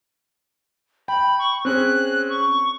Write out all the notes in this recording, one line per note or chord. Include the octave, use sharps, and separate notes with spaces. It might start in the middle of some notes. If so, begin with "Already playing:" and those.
G5 B5
C#6
C4 C#4 G#4 F#6
C#6